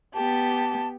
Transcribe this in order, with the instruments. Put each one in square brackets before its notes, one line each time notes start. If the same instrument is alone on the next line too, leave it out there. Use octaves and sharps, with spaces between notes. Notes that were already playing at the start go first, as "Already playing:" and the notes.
[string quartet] B3 G4 [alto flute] A5